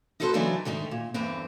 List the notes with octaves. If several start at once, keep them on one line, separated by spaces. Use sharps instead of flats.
D#4 E4 F#4 A4 B4 C5
C#3 E3 F#3 D4 D#4 D5
G#2 D3 D#3 A3 D#4
A#2
E2 G2 D3 C4